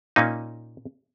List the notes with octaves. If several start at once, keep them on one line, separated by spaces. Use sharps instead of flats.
A#2 A#3 C#4 D#4